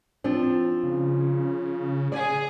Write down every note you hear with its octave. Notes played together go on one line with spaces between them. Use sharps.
F3 C4 D4
C#3
G#4 D5 G#5